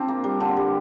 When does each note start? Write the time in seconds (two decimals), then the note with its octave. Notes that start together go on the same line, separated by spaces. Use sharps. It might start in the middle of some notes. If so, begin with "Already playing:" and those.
Already playing: C4 D4 F4
0.08 A#3
0.24 G3
0.40 D3
0.56 G3